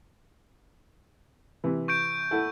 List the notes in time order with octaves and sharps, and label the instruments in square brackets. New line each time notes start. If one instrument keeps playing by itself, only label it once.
[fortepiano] C3 E3
[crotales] C#6 G6 D7
[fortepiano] E4 A4 F#5